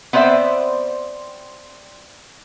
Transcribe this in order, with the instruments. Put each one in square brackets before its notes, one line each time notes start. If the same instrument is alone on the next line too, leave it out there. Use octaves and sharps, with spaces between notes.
[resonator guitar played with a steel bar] B3 C4 C5 D5 E5